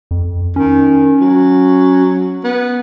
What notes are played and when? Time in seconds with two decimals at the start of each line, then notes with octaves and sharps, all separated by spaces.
0.11 F2
0.56 D#3 C#4
1.20 F#3
2.44 B3